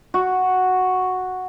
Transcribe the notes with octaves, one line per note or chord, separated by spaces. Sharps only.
F#4